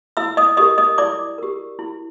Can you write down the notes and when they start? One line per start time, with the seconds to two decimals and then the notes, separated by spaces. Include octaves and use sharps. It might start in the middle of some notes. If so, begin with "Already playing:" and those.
0.17 E4 E5 E6
0.37 D#5 D#6
0.57 G4 A#4 D#5 D#6
0.78 D#5 D#6
0.98 E4 D5 D6
1.38 G4 A#4
1.79 E4